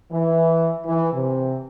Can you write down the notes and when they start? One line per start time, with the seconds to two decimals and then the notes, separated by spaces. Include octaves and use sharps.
0.12 E3
0.85 E3
1.13 C3